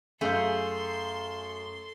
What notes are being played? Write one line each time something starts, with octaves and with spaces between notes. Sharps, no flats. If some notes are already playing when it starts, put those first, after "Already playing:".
F#2 A3 G#4 A4 F5 C6 G6